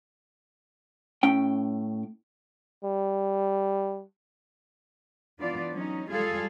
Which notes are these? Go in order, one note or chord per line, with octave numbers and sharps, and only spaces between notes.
A2 C#4 G5
G3
E3 B3 D4 F4 D5
F#3 C#4 D#4
G3 G#3 F4 G#4 A4 F5